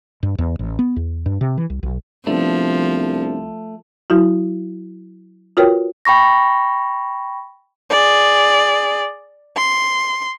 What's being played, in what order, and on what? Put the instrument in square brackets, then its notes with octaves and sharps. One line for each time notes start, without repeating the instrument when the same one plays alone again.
[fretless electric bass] G2
E2
A1
B3
E2
G2
C3
E3
C2
B1
[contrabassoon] C2 [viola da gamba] F3 [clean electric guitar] A3 [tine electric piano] B3 C4 D4
[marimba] F#3 E4 F#4
F4 F#4 A#4 B4 C#5 G5
[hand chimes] G5 B5 C#6 A#6
[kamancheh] G#4 D5
C6